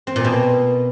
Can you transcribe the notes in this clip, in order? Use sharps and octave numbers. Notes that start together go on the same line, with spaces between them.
C4
A#2
B2